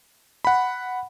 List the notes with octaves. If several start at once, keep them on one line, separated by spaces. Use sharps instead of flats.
F#5 B5